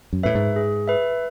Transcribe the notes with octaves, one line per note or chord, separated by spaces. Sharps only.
F#2
A2 B4 E5
G#2
G#4
B4 E5